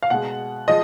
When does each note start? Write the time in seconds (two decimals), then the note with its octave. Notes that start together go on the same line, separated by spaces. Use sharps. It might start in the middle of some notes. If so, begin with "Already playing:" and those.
0.03 F5
0.10 B2 G#3 F#5
0.68 F3 G#3 D#5